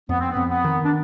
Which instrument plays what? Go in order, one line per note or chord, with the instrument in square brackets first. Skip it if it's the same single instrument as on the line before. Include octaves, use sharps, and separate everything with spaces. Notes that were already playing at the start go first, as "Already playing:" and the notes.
[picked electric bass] F2 [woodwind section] B3
[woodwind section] C4
B3
[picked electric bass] F2
[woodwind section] B3
[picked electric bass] D#3
[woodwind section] D4